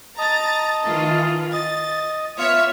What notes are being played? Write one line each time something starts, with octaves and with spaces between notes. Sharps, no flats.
D#5 A5 A#5 A6
D#3 E3 F4
D#5 A6
B3 F4 C#5 E5